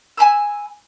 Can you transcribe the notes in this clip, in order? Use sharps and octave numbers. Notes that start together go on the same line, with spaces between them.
G#5 A#5 B5 E6